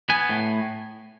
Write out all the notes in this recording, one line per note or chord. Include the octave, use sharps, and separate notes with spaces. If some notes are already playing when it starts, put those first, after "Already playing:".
B3 G#5
A2